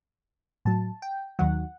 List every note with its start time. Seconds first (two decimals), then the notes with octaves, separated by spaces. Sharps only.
0.65 A2 F#3 A5
1.02 G5
1.39 D#2 D#3 F#3 F#5